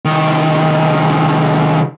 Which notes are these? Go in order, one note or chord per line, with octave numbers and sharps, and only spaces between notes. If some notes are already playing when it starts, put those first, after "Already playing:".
C2 D#3